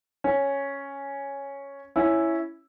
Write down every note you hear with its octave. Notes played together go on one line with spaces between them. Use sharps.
C#4
C#4 E4